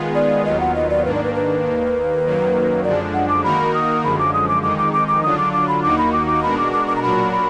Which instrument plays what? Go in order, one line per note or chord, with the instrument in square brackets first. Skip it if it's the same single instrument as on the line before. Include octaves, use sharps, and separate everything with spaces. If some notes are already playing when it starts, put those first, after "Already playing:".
Already playing: [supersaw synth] D#3 G#3 B3 F4 G#4
[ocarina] D5
[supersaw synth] D#2 D#3 F#3 B3 F4 [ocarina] D#5
[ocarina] F#5
D#5
D5
[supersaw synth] G#2 D#3 A#3 D4 [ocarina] B4
[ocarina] D5
B4
B4
[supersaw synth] D#2 D#3 A#3
F#2 D#3 F#3 A#3
[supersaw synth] F#2 D3 F3 G#3 D4 [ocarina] D5
[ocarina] F#5
D6
[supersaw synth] D#3 A#3 D#4 F#4 A#4 [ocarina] B5
[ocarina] D#6
[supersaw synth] F#2 D3 F3 G#3 [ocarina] B5
[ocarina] D6
D#6
D6
[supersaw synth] F2 D#3 G#3 D#4 [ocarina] D6
[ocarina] D6
D6
D6
[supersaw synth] D3 F#3 D4 F4 [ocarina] D#6
[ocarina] D6
D6
B5
[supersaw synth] D#2 D#3 A#3 D#4 F#4 [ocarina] D6
[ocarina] B5
D6
D6
[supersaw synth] B2 G#3 D4 F#4 A#4 [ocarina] B5
[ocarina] D6
D6
D6
A#5
[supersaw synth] A#2 F#3 D4 F#4 A#4 [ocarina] B5
[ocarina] B5